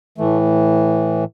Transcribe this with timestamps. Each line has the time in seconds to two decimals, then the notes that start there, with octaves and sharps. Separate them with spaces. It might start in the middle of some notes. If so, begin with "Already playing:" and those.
0.18 A2 E3 A3